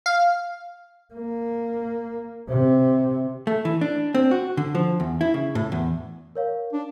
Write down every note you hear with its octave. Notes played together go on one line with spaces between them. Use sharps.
F5
A#3
C3
A3
E3
D4
C4
F#4
D3
F3
E2
E4
C#3
A2
E2
A#4 C#5 F5
D4